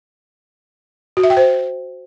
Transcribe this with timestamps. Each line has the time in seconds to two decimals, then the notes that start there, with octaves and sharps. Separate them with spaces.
1.17 F#4
1.23 E5
1.30 G5
1.37 C5